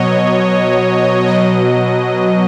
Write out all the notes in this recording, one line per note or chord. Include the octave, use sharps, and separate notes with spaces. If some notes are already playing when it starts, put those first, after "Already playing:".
Already playing: B2 F#3 C#5 D#5
B2 F#3 D#5